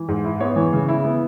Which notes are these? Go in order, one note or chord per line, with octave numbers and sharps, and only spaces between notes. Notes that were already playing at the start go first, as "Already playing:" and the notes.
Already playing: E3
G#2
E4
B3 C#5
E3
C#3
E4
B3